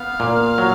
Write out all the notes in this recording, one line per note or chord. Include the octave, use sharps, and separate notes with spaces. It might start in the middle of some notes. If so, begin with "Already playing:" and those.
Already playing: B3 F5
A#2
F#3